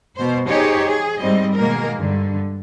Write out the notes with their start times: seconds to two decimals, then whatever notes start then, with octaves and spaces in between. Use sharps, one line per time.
0.16 B2 C5
0.48 D#4 G4 G#4 C5 C#5
0.87 G#4
1.18 G#2 G3 C4 D#5
1.56 B2 D#3 G#3 A#3 A#4
1.96 G2 D3